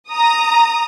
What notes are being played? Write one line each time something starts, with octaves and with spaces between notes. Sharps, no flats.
A#5 D#6